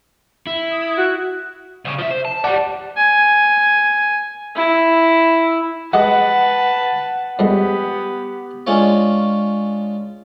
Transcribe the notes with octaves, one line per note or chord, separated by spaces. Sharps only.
E4
D#6
F#4 F#6
C2 C#3
F3 E5
C5
A5
F#3 G3 D5 F#5 A5
G#5
E4
G#3 G4 B4 D#5 F#5 A5
F2 G3 G#3 B3 G4
G#3 C#4 D4 F4 C#5